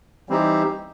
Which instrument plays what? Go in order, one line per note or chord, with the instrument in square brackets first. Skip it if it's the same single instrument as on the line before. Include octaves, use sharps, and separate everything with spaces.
[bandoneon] E3 G3 C4 D#4 G4